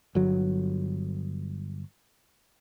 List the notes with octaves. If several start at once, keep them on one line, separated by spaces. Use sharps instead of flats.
G1 F#3